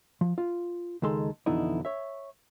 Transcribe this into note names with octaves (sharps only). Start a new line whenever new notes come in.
F3
F4
C#2 D#3 G#3 A4 C6
F2 B2 D3 E3 D#4 E4
C#5 E5